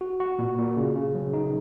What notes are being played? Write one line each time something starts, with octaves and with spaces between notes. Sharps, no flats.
F#4
F#4
A#2
A#2
C#3
C#3
F#3
D#4